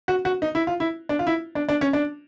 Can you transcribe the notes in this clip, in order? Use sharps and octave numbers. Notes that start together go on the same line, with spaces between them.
F#4
F#4
D#4
E4
F4
E4
D4
F4
E4
D4
D4
C#4
D4